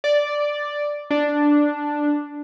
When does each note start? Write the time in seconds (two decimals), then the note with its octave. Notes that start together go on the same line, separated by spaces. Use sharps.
0.04 D5
1.11 D4